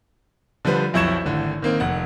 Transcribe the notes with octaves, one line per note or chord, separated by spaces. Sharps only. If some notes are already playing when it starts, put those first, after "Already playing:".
D3 F3 G3 B4 C5
B1 F2 E4 C#6 G#6 E7
G#1 A2 D3
D#3 A#3 C4
F1 F#5